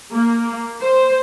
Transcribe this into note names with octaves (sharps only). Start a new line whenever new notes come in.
A#3
C5